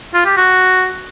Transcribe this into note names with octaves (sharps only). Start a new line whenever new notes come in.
F4
G4
F#4